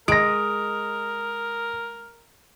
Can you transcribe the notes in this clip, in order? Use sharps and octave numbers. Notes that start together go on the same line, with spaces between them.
G#3 A#4 D#6 A#6 D7